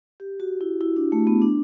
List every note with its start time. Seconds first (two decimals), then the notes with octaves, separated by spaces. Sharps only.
0.20 G4
0.40 F#4
0.61 E4
0.81 E4
0.96 D4
1.12 A3
1.27 B3
1.42 D4